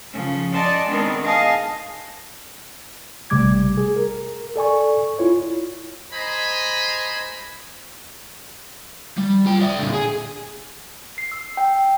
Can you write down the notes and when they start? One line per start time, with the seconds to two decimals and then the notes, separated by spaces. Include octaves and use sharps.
0.12 C#3 F3 C#4
0.53 D5 D#5 F#5 G#5 A5 C6
0.87 D#3 G#3 B3 C4 D4
1.23 G#4 D#5 F5 G#5 A5
3.30 A1 C3 G3 A3 D6 G#6
3.77 G#4
3.96 A#4
4.56 A4 D5 G#5 C#6
5.19 E4 F4 C#5
6.12 C5 D#5 G#5 A#5 B5
9.17 G3
9.46 F4 G5
9.61 D5 E5
9.79 A#2 D3
9.94 G#4
11.18 C7
11.32 E6
11.57 G5